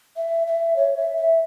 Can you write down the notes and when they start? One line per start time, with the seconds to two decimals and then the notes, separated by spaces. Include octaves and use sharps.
0.17 E5
0.47 E5
0.76 C#5
0.97 E5
1.17 E5